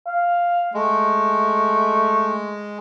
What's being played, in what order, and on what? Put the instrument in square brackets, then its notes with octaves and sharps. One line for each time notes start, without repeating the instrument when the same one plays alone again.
[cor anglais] F5
[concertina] G#3 [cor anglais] A3